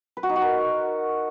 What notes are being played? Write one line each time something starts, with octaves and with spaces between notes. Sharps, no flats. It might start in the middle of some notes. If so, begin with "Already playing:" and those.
B4
F#4
D#4
F#4
A#4